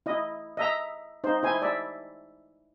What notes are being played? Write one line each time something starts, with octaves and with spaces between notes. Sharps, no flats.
E4 D#5
D#5 E5 A#5
D#4 C5
E4 C5 G#5
D5 E5